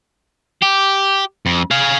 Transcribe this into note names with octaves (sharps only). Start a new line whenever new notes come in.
G4
F2
G#4 F5